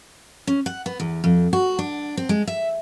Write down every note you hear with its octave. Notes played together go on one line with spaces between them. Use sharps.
C#4
F#5
B3
E2
F2
F#4
D4
C4
G#3
E5